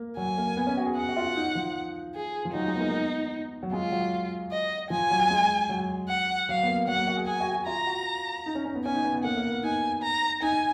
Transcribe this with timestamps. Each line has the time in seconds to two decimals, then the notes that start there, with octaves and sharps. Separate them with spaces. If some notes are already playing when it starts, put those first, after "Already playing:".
Already playing: A#3
0.17 F#3 G#5
0.38 A#3
0.57 B3
0.67 C#4
0.77 F#4
0.86 G#4
0.96 G#4 F#5
1.09 F#4
1.16 F4
1.36 D#4
1.55 F3
2.15 G#4
2.45 F3
2.54 F#3 D#4
2.67 G#3
2.75 B3
2.80 A#3
2.93 B3
3.63 F#3
3.73 G#3 F4
3.92 F#3
4.51 D#5
4.90 F3 G#5
5.11 F#3
5.30 G#3
5.69 F#3
6.09 F#5
6.49 F#3 F5
6.63 B3
6.68 A#3
6.87 F#3 F#5
6.97 A#3
7.07 F#4
7.17 G#4
7.27 G#4 G#5
7.40 F#4
7.54 F#4
7.66 F4 A#5
7.86 F#4
8.46 D#4
8.55 C#4
8.65 C#4
8.75 B3
8.85 C#4 G#5
8.95 D#4
9.04 B3
9.14 B3
9.24 A#3 F#5
9.37 A#3
9.51 B3
9.63 D#4 G#5
10.03 A#5
10.42 D#4 G#5